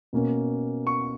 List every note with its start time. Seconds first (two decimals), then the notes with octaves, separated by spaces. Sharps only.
0.13 B2 A#3 C#4
0.87 C#6